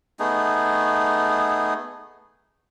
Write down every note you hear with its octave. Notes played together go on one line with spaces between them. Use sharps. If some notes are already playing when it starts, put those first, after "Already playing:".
A3 B3 D#4 G#4